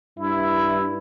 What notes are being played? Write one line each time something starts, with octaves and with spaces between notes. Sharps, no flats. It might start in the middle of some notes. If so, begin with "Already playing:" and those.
G2 E4